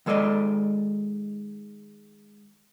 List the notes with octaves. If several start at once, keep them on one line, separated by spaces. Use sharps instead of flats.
D#3 G#3 A4 D5 D#5